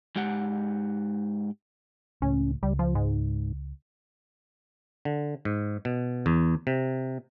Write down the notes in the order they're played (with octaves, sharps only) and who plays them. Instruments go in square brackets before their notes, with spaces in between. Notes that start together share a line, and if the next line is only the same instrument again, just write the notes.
[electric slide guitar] G#2 G#3 G4 F#5
[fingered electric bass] C#2 A2 [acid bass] C#4
[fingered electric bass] C#2 [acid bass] G3
[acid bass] F3
G#2
[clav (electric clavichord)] D3
G#2
B2
E2
C3